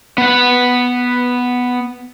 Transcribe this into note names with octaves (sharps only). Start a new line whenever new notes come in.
B3 F#5